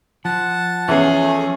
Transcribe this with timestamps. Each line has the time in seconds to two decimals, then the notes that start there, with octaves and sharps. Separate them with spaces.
0.25 F3 F#5 A5
0.88 E2 C#4 G#4
1.23 A3